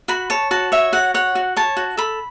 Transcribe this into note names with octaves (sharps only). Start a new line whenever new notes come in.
F#4 B5
C#5 A5
F#4 A5
C#5 E5
F#4 F#5
C#5 F#5
F#4
C#5 A5
F#4
A4 B5